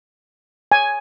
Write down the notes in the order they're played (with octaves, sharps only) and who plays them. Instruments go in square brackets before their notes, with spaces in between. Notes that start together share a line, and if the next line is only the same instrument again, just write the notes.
[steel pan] G#5